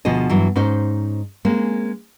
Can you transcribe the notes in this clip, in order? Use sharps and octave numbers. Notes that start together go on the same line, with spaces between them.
D2 B2 F3 G#4 D#5
G2 E3 F#3
G#2 C#4 D#4 C5
G#3 A#3 C4 C#4